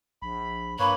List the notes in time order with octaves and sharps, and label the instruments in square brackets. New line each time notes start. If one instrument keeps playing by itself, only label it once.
[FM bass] A#1 [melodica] B5
[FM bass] G2 [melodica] A#3 B4 C#5 [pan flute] B5